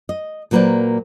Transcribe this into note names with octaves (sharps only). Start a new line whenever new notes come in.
D#5
A#2 F#3 A#3 B4 C5 D5